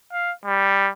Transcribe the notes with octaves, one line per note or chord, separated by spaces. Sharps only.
F5
G3